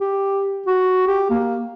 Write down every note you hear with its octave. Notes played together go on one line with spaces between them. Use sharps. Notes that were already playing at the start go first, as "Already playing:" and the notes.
G4
F#4
G4
A#3